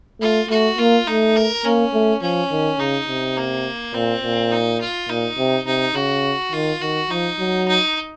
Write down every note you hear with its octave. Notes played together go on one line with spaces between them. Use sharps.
A3 F4
A3 F#4
A#3 F4
A3 D#4
A#4
A#3 C#4
A3
F3 C#4
D#3
C#3 D#4
C3
A#3
A#2 C4
A#2
D#4
F4
A#2 D#4
C3
C3 D#4
C#3 F#4
D#3 F4
D#3 F#4
F3 D#4
F#3
D#4